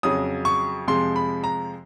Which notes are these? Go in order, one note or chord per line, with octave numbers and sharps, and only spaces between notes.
F2 C#3 F#3 D#6
C#6
F2 C3 F3 G#3 C6
B5
A#5